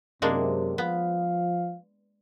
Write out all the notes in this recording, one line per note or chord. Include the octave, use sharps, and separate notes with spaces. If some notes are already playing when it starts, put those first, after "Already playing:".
F#2 C3 G#3 A#3 D4
F3 B3 F5